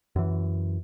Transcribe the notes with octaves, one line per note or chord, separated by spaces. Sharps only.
F#2 E3